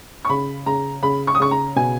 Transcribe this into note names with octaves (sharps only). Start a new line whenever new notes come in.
C#6
C#3 B5
C#3 A#5
C#3 B5
C#6
D#6
C#3 C#6
A#5
B2 G#5